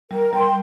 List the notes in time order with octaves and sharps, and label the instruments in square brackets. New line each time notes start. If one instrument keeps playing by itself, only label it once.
[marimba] G3 [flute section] A#4
[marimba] G3 [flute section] G5
[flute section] C6